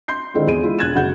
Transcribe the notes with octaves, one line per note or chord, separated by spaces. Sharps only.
C6 G6 C7
D3 D#3 G#3 C4 E4 F4
E2 G#4 D#7
G#3 E4 F4
E1 F#6 G#6 A6 E7
F#1 C#3 F#4 F#5 G6